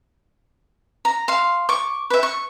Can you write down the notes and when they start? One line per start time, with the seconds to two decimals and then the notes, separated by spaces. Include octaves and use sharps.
1.05 A#5
1.28 F5 C6
1.69 C#6 D6
2.10 B4 E5
2.23 C#6